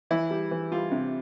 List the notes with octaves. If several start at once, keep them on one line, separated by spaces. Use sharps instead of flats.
E3 E4
G3
E3
G3 F4
C3